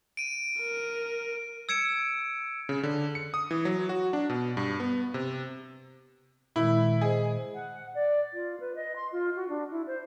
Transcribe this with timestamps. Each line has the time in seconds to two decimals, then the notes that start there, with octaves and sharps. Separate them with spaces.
0.17 D7 D#7
0.59 A#4
1.69 E6 G#6 C#7 D7 E7
2.69 C#3
2.83 D3
3.15 C#7
3.34 D#6
3.51 E3
3.65 F#3
3.89 F#4
4.13 D4
4.30 B2
4.57 G2
4.80 B3
5.14 C3
6.56 A#2 D#3 G#3 E4
7.01 G#4 C5 D#5
7.54 F#5
7.95 D5
8.33 F4
8.60 B4
8.75 D#5
8.96 C6
9.12 F4
9.36 F#4
9.49 D4
9.71 E4
9.87 C5